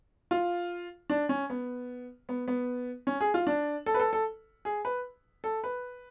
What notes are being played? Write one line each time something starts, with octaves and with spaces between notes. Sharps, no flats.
F4
D4
C#4
B3
B3
B3
C#4
G#4
F4
D4
A4
B4
A4
A4
G#4
B4
A4
B4